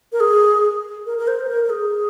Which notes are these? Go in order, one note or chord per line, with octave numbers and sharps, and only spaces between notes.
A#4
G#4
A#4
A#4
C5
C5
A#4
A#4
G#4